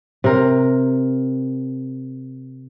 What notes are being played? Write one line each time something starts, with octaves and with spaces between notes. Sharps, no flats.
C3 A#4